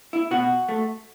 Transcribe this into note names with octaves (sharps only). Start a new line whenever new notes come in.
E4
B2 F#4
A3